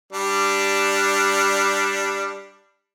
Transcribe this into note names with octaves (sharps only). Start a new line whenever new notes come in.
G3 D4